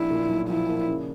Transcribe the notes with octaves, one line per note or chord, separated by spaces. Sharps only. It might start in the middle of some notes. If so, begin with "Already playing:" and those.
Already playing: A#1 E4
A#2
B1
F3 E4
A#3
C#3